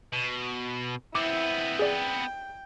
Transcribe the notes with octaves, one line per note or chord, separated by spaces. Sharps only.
B2
B3 C4 E4 D6
G#4 D5 G5